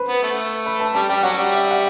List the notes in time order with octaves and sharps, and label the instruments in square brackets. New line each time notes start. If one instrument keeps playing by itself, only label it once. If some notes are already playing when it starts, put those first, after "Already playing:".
Already playing: [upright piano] B4 C5
[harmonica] B3
A3
[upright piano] B4
A5
[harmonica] G3 [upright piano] A5
[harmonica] G3 [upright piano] G5
[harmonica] F#3 [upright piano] F#5
[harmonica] G3
[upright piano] E5
F#5